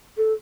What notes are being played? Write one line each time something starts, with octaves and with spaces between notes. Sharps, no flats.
A4